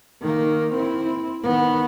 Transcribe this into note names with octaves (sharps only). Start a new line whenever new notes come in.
D#3 A#3
C4 E4
D#3 B3